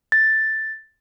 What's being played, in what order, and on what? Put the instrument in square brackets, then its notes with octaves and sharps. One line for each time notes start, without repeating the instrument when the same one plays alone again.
[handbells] A6